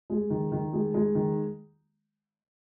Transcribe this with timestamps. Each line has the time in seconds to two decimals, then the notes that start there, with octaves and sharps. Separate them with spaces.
0.10 G#3
0.30 D#3
0.52 D#3
0.73 G#3
0.94 G#3
1.15 D#3